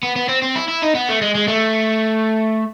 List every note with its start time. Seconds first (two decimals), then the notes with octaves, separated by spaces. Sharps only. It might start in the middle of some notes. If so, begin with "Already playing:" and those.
0.03 B3
0.16 B3
0.29 C4
0.42 C4
0.56 E4
0.68 E4
0.82 D#4
0.95 B3
1.09 A3
1.22 G#3
1.35 G#3
1.48 A3